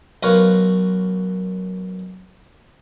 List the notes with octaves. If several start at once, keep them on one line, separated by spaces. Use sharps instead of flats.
B1 A#4 B4 C#5 F5 C6